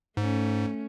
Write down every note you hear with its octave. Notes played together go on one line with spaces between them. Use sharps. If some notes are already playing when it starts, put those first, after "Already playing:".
G#2 A3 C#4